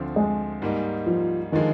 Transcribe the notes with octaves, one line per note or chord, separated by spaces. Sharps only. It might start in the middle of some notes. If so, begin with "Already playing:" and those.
Already playing: D2 D3 F3 C4
G#3
G#2 G3 A#3 D#4
F3
D3 D#3 F3 G#3